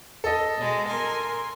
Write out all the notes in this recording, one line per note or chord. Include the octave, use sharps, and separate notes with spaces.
A4 D#5
B2 G#3
A#4 G#5 C6